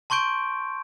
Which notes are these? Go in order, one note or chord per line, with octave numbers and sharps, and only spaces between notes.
A5 C6 C#6 G6 D7